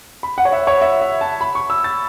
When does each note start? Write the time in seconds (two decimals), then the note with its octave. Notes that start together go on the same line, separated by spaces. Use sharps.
0.23 B5
0.38 F#5
0.45 C#5
0.52 E5
0.67 C#5
0.81 E5
1.01 E5
1.21 A5
1.41 B5
1.55 C#6
1.70 E6
1.84 A6